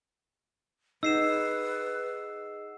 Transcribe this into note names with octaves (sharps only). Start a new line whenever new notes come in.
D#4 G#4 B4 D#5 F#5 E6 C7 E7